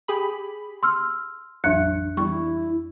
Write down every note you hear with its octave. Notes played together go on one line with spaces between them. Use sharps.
G4 G#4 B5
C6 E6 F6
A1 F2 F#3 D4 E5 F#6 C#7
E2 G3 E4 C#6